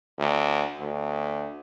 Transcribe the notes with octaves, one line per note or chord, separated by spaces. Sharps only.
D2
D2